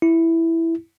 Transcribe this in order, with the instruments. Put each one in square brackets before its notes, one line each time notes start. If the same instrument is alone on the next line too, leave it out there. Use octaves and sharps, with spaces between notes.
[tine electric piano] E4